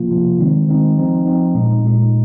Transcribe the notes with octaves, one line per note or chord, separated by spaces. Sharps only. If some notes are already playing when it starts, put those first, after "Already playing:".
Already playing: C3 F3 A#3 F4
C3 F3 A#3 F4
D#3 G#3 C4 D#4
D#3 G#3 C4 D#4
F3 C4 D#4
F3 C4 D#4
A#2 G#3 D#4
A#2 G#3 D#4